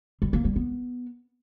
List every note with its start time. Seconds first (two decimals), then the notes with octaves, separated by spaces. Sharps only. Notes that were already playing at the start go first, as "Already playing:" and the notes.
0.22 G3
0.33 A#3
0.44 G3
0.56 B3